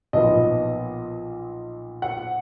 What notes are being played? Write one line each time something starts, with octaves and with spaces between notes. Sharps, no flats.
B1 A#2 F3 B3 F4 D#5
F#5